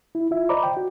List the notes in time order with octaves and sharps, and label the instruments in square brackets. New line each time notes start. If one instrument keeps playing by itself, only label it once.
[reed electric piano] E4
F4 E5
C5 D5 D#5 A#5 B5 D6
G5
F#4